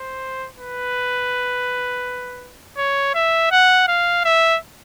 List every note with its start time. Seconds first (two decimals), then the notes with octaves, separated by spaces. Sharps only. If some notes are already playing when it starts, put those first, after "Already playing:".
Already playing: C5
0.56 B4
2.77 C#5
3.14 E5
3.51 F#5
3.88 F5
4.24 E5